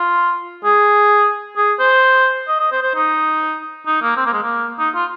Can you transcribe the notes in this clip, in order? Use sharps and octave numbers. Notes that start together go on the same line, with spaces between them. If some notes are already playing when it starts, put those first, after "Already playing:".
Already playing: F4
G#4
G#4
C5
D#5
D#5
C5
C5
D#4
D#4
A#3
C4
A#3
G#3
A#3
D#4
F4